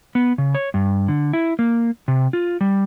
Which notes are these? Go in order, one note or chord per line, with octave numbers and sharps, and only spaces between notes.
B3
C#3
C#5
G2
D3
E4
A#3
C3
F4
G3